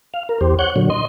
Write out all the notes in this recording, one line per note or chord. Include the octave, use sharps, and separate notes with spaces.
F5
A#4
E2 G4 C5
C#5 F#5 F#6 G6
A#2 D3 F#3
D#5 C6